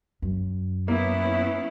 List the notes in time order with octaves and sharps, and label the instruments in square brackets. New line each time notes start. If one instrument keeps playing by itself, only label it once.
[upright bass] F#2
[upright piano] A#3 [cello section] B3 C#4 E4